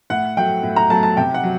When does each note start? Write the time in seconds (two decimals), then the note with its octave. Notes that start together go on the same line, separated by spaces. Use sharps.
0.10 A2 F#5
0.37 F#3 A3 G5
0.63 A2
0.76 A#5
0.90 F#3 A3 A5
1.03 A5
1.17 C3 G5
1.34 F#5
1.43 F#3